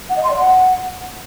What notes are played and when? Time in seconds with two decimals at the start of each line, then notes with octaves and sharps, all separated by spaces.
0.10 F#5
0.17 D#5
0.24 C6
0.30 D5
0.37 F#5